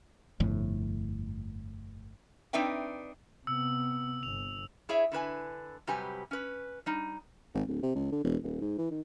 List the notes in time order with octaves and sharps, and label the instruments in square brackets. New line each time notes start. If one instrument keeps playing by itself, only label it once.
[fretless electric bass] G1 F2 A2
[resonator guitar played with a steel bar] C4 D4 D#4 B4 E5 G5
[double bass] C3 B3 [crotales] E6
[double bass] G1 [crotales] F7
[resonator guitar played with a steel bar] E4 G#4 C#5 E5
D3 E4 B4 G#5
C3 F#3 G3 G4 B4 G#5
C#4 B4
G3 D#4
[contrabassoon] G#1
D1
C3
C#2
D3
E1
D#1
G#2
E3
D#3